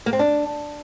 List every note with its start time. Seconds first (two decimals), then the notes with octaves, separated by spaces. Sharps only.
0.06 A#3
0.13 C4
0.19 D4